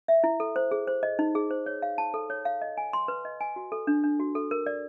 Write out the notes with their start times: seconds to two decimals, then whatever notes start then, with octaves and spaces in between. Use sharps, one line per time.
0.08 E5
0.24 E4
0.40 A4
0.56 C5
0.71 G#4
0.88 C5
1.03 D#5
1.19 D#4
1.35 G#4
1.50 C5
1.66 C#5
1.82 F5
1.98 A5
2.14 A4
2.30 C#5
2.45 F5
2.62 D#5
2.77 G#5
2.93 C6
3.08 B4
3.25 D#5
3.41 G#5
3.56 F#4
3.72 A4
3.87 D4
4.04 D4
4.20 F#4
4.35 A4
4.51 A#4
4.66 D5